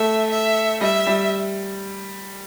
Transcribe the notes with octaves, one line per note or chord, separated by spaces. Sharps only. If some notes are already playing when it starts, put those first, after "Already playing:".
Already playing: A3 E5
E5
G3 E5
G3